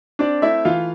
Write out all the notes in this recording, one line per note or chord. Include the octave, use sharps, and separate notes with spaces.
C4 D4 D5
A3 E4 E5
E3 F4 F5